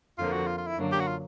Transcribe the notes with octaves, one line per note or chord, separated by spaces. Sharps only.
F2 D3 F3 A#3 F4
F#4
F4
F4
E4
F#2 D3 F#3 A#3 D4
G4
F#4
F4